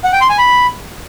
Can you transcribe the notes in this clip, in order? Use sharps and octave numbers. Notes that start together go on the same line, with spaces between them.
F#5
G5
C6
G#5
B5